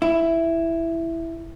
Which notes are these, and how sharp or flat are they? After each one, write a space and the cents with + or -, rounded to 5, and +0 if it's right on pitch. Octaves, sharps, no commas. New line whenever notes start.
E4 +5